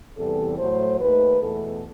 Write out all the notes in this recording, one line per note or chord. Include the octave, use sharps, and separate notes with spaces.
E2 C3 E3 G3 A4
A2 F#3 A3 C5
D#2 D#3 A3 B4
E2 B2 A3 A4